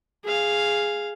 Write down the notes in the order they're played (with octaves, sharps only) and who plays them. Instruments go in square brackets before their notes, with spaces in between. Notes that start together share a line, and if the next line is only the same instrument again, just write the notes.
[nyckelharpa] G#4 F5